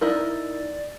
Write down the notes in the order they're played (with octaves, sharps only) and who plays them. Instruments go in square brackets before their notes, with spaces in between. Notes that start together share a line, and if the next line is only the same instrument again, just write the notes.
[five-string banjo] D#4 E4 A#4 [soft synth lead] D5